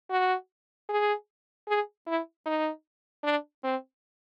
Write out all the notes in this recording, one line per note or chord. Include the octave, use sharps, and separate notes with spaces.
F#4
G#4
G#4
E4
D#4
D4
C4